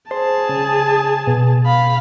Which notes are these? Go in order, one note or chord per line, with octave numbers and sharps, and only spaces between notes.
G#4 C5 A5
C#3
B2
F5 B5